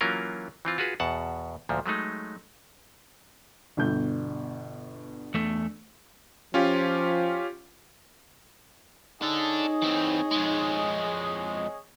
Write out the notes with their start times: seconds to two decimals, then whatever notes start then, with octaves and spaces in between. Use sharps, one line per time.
0.01 E3 F#3 A#3 C#4 F4 A#4
0.65 E3 C4 F4
0.78 F4 F#4 G#4 B4
1.00 E2 B2 F#5 A5
1.69 D2 A#2 F3
1.86 F#3 G#3 A3 D#4
3.77 G1 B2 G6
5.34 E2 A3
6.54 F3 C#4 F4 G4
9.22 D4 D#4 G#4 A4 C#5 D#5
9.82 E3 C4
10.31 F2 G#3